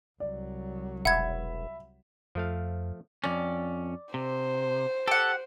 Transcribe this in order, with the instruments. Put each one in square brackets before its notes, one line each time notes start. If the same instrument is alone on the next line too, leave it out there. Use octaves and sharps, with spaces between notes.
[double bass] C2 F#3 [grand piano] D5
[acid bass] E1 [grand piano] E5 B5 [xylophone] F#5 G#6
[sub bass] F2 [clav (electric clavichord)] F3 A3 F5
[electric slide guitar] F2 C#4 [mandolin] D5
[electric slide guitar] C3 [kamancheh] C5
[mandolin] G4 F#5 [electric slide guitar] A4